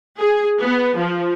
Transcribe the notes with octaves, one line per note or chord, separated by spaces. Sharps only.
G#4
B3
F3